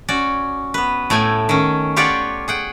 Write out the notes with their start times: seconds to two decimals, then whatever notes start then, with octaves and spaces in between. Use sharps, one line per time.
0.08 C#4 F#4 D5
0.74 B3 B4
1.10 A2 A3 G5 G#5
1.49 D#3 C#4
1.96 F4 G4 C#5 D5 F#5 G5
2.48 G#4 F#5 G5